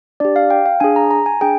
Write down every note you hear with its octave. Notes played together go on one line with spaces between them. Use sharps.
D4 G4 D5
F5
G5
F5
D4 G#4 G#5
A#5
A#5
G#5
D4 G#4 G5